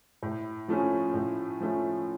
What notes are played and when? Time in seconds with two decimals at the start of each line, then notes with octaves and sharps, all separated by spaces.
0.22 A2
0.68 F3 A3 C#4
1.14 A2
1.60 F3 A3 C#4